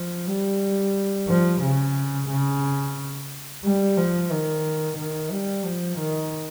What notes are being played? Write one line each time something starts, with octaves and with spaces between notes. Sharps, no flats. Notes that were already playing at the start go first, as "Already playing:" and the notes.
Already playing: F3
G3
F3
C#3
C#3
G3
F3
D#3
D#3
G3
F3
D#3